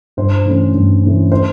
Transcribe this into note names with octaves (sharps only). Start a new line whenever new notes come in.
G2 C5
E3 A3 C#4
G2
E3 A3 C#4
C5